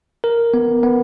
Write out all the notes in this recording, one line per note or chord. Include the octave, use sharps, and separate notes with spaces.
A#4
B3
B3